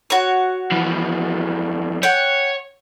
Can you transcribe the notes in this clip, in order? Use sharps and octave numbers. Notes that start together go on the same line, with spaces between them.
F#4 C#5
F2 E3
C#5 F#5 G5